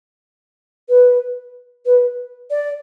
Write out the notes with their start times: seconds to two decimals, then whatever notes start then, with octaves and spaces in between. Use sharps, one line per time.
0.88 B4
1.85 B4
2.50 D5